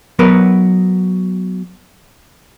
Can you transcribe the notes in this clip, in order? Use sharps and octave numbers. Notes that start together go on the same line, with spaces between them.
F#3 B3 A#4 B4